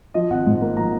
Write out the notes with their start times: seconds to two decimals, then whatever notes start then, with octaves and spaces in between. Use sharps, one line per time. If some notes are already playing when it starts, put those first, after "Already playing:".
0.14 F3 D#5
0.30 G#1 F#5
0.46 G#2
0.62 A#3
0.77 F3 A#5